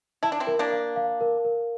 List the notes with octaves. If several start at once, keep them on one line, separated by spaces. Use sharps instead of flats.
E4 A5
D4
C4 E4
A#4
A#3 D4
F5
F5
A#4
A#4